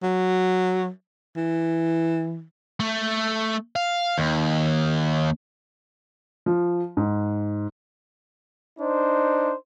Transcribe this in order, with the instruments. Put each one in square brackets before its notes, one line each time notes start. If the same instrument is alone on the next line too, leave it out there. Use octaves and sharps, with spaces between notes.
[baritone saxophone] F#3
E3
[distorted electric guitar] A3
F5
D#2
[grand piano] F3
G#2
[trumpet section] D4 D#4 C5